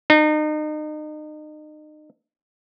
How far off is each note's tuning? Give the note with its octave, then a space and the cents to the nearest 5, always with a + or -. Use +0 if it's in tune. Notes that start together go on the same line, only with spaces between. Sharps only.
D#4 -35